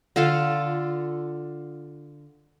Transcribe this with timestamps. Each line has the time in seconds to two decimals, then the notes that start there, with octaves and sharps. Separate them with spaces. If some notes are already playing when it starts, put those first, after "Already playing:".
0.16 D3 D4 F4 A4